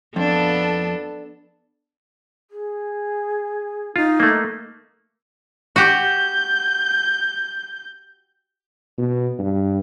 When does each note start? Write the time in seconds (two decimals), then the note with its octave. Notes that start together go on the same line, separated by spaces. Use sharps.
0.16 F2 B3 D4 A4
2.51 G#4
3.96 D#4 F4
4.20 A3 A#3
5.76 F#4 G4 G6
8.98 B2
9.39 G2